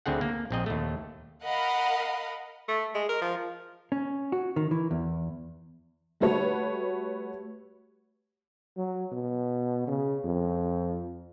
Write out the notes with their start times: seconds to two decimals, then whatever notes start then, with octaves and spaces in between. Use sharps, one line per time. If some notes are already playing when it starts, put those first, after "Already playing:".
0.06 D2 D3 C4 G#4 F#5
0.21 A#3
0.51 A#1 C4 D#5
0.66 D#2 A3
1.44 A#4 D#5 F5 F#5 B5
2.68 A3
2.94 G#3
3.09 A#4
3.21 F3
3.92 C#4
4.32 F#4
4.56 D#3
4.71 E3
4.91 E2
6.20 G3 A3 F#4 B4 C#5
8.77 F#3
9.12 B2
9.87 C#3
10.24 F2